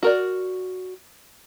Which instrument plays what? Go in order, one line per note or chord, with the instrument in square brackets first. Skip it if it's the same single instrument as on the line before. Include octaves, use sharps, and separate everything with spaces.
[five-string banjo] F#4 A#4 D5